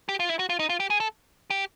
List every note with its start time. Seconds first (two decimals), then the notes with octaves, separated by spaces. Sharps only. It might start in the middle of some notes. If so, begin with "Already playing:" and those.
0.09 G4
0.20 F4
0.29 E4
0.39 F#4
0.50 F4
0.59 D#4
0.70 F4
0.80 G4
0.90 G#4
1.00 A4
1.50 G4